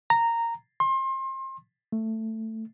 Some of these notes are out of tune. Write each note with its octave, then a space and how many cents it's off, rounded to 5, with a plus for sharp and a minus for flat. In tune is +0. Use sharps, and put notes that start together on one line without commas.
A#5 -10
C6 +30
A3 +10